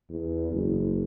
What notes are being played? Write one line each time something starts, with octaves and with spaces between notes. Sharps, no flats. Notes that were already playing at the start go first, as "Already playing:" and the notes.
E2
F#1